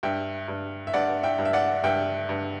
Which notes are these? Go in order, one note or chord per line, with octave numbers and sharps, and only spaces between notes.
G2 E5 G5
G2
E5
G2 D5 F#5
E5 G5
G2
E5
D5 F#5
G2 E5 G5
G2